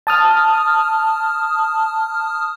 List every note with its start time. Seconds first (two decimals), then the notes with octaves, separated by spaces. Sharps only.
0.07 A5 D#6 F6